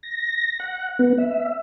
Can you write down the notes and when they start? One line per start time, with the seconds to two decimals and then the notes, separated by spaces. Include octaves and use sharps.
0.03 A#6
0.60 F#5
0.99 B3
1.18 E5